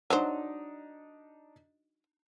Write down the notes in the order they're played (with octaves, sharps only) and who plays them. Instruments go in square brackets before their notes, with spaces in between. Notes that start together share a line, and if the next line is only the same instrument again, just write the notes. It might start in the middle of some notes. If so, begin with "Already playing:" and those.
[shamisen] F#3 C5 [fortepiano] D4 D#4